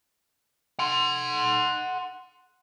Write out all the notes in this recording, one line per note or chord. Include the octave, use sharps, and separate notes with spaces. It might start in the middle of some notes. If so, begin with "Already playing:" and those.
F#5 C6